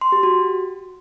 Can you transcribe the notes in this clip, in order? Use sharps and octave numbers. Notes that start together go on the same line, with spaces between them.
C6
G4
F#4